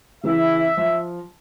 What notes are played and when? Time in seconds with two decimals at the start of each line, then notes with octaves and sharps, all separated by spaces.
0.24 C#3 E3 E4 E5
0.77 F3